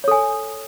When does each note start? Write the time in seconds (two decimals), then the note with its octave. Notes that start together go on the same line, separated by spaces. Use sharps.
0.04 C#5
0.08 A4
0.11 G#5